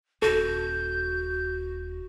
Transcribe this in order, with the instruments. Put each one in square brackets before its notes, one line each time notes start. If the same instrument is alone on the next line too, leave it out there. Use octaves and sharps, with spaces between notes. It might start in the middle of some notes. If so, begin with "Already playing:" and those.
[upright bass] D#1 [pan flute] F#4 [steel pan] A4 [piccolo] G6